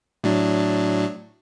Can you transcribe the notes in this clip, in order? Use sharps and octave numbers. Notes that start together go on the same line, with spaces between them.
A2 F#3 D4